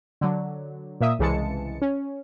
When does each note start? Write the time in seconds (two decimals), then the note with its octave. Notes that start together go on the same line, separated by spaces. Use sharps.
0.21 D3 F#3
1.01 A#2 A#3 E5 D#6
1.19 C2 C#3 E3 G#3 A5 C#7
1.82 C#4